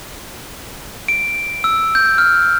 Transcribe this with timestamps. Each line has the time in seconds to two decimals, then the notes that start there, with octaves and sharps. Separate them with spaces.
1.08 D7
1.64 E6
1.95 G6
2.18 F6